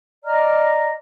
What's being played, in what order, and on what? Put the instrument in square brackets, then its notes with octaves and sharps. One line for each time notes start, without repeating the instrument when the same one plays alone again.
[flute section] D5 D#5 A#5 F6